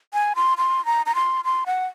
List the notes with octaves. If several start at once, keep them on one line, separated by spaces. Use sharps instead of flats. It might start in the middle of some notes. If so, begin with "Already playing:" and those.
G#5
C6
C6
A#5
A#5
C6
C6
F#5